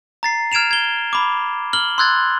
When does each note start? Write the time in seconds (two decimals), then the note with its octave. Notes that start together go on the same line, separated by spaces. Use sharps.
0.23 A#5 A6 C7
0.52 F6 G#6 D7 E7 F7
0.71 G#6 G7
1.13 B5 D6
1.73 F6 F#7 G7
1.98 C6 E6 F#6 G#6 A6